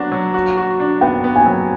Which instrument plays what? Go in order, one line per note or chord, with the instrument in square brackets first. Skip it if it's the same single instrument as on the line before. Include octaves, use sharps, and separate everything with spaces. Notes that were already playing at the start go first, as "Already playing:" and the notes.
Already playing: [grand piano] F#3 B3 D4 F#4
F#3
F#4
F#4
D4
[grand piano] B3 [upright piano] G5
[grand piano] B3
[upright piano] G#5
[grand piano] F#3